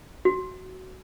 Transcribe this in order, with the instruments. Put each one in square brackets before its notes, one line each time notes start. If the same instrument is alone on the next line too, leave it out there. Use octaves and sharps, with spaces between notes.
[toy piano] F#4